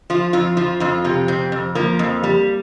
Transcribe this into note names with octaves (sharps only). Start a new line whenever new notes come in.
F3 F4
F2 F4
F3 F4
F2 F4
C3 F4
F2 C4
F2
F3 A#3
F2
G3